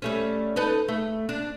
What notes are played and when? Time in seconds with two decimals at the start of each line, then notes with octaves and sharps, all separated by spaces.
0.02 G3 A3 C#4
0.56 D#4 A4 B4
0.88 A3
1.29 D4